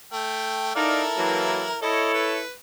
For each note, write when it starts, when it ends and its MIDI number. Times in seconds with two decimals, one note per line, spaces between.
0.13 0.72 57
0.13 0.72 79
0.75 1.04 63
0.75 1.78 64
0.75 1.78 69
0.75 1.78 70
0.75 1.04 74
0.75 1.04 77
1.17 1.65 52
1.17 1.65 54
1.17 1.65 58
1.82 2.41 64
1.82 2.41 69
1.82 2.41 73
1.82 2.11 75
2.14 2.52 71